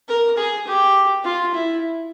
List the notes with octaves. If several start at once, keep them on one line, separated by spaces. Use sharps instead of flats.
A#4
G#4
G4
F4
E4